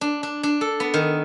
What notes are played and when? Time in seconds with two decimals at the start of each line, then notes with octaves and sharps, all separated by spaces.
0.01 D4
0.23 D4
0.43 D4
0.61 A4
0.80 B3
0.94 D#3